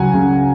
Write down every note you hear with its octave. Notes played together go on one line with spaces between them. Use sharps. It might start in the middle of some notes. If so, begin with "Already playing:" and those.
Already playing: C#2 F#3 F#5 G#5 A#5
C#3